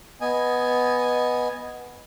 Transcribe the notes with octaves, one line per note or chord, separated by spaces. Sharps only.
B3 D#5 G#5